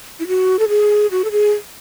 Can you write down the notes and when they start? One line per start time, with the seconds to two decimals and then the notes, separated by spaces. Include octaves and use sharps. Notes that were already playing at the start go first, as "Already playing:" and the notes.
0.19 E4
0.27 F#4
0.59 A4
0.68 G#4
1.11 F#4
1.24 A4
1.31 G#4